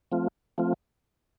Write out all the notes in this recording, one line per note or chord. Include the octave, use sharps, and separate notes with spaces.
F3 A3 C4 F4
F3 A3 C4 F4